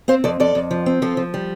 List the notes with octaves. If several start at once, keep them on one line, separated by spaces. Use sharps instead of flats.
C4 C5 F5
F2 A4 D5
F2 A4 D5
F2
F3
C4
F3 F4 A4
F3
G3